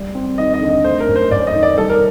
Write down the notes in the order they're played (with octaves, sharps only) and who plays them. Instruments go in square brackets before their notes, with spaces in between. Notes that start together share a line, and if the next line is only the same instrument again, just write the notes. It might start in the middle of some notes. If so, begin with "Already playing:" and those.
Already playing: [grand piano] G3
C4
[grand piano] D#2 [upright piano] D#5
[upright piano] D#5
[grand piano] D3
[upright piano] D#5
[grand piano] A3 [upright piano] C5
[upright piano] A#4
[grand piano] F#2
[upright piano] C5
[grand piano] F#2 [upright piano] D5
[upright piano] D#5
[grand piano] D#3
[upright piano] D5
[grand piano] G3 [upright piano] A4
[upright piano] A#4